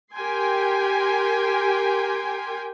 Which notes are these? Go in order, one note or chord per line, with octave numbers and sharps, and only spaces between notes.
G4 A#4 G5 G#5 C6